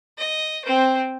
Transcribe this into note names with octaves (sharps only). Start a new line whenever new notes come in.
D#5
C4 C5